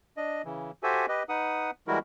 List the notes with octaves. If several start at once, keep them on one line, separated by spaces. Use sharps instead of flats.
D4 D#5
C#3 E3
F#4 G4 A4 C5 E5 G#5
G4 B4 D#5
D#4 B4 F#5 D#6
E3 G3 G#3 E4 F#4 A#4